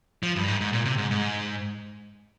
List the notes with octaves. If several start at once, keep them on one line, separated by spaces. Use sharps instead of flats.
F3
G2
G#2
G#2
A#2
C3
G#2
G#2